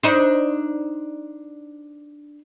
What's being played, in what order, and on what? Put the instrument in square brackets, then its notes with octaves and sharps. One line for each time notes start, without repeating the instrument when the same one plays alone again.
[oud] D4 D#4 C5